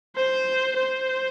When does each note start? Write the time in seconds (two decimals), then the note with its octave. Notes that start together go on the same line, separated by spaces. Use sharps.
0.16 C5
0.77 C5